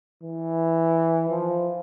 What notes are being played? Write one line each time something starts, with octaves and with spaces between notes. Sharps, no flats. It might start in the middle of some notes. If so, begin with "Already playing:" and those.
E3
F3